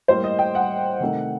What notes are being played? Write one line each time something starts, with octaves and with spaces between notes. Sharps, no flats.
A2 G3 A#3 C5
D#5
G5
F#5
C3 D#3 A3